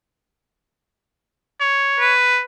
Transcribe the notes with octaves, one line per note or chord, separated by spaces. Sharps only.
C#5
B4